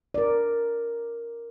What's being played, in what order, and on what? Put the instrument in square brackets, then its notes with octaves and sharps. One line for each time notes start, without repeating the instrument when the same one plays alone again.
[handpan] A#4 D5